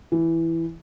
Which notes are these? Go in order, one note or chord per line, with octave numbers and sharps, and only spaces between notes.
E3